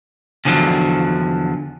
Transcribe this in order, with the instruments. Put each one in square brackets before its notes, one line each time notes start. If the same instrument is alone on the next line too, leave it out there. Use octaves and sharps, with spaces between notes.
[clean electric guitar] E2 D3 F3 F#3